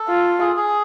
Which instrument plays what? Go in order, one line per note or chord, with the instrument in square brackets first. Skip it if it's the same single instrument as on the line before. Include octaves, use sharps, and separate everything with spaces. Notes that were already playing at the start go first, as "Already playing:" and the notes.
Already playing: [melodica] A4
[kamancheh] F4
[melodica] G#4
G#4